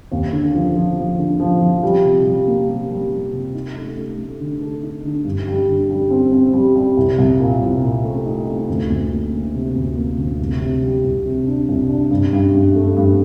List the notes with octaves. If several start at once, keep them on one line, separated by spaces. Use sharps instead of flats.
D#2
D3
F3
F3
F3
D3
F3
F3
G3
C3
G3
A#3
G3
G3
G3
C3
D#4
A3
A3
A3
D3
A4
D#4
D3
G2
G3
D3
G3
C4
C4
G3
G3
C2
C2
A#2
C2
A#2
A3
D#4
A3
D2
D2
A#3
A#3
C3
D2
A#3
D2
C2
C3
G3
C2
C3
D4
C2
D4
G2
G2
G2
A3
G2